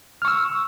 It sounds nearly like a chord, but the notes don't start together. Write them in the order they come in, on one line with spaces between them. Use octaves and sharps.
F6 C#6 E6